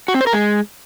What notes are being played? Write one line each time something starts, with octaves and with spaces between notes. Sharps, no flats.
F#4
C4
C5
A#4
G#3